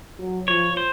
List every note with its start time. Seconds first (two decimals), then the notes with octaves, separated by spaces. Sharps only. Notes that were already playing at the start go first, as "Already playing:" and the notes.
0.19 F#3
0.48 F3 C#5
0.77 C5